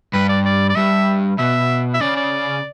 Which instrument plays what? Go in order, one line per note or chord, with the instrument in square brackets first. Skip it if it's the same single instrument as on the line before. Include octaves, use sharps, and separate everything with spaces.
[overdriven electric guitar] G2 [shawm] B4
[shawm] D5
D5
D5
[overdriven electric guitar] G2 [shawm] E5
[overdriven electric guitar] B2 [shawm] E5
[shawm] E5
[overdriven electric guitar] C#3 [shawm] D5
[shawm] D5